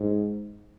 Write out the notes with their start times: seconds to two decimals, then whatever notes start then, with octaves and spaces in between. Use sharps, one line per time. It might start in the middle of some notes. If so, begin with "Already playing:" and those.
Already playing: G#2